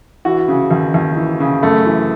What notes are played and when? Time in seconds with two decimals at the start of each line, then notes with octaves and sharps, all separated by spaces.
0.25 E3 F#4
0.48 C#3
0.71 D#2
0.94 D#2
1.17 E3
1.40 C#3
1.63 F#2 A3
1.86 E3